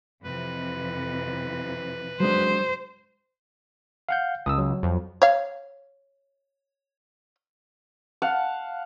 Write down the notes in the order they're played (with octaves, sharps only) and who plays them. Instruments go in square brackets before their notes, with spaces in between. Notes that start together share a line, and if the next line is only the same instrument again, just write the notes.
[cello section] F2 C3 E3 [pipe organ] B4
[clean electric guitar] F#3 G#3 D4 [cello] C5
[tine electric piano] F5 F#5 G6
[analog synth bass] C#2 [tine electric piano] D#6 E6
[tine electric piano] F#3
[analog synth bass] F2
[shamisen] C#5 F5
[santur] F5 F#5 A5